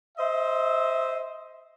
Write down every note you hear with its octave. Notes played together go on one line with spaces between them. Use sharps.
C5 D#5 E5